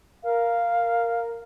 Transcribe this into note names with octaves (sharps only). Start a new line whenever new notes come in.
A#4 F5